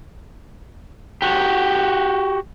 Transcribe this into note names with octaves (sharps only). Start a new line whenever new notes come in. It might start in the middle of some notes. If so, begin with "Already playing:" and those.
F#4 G4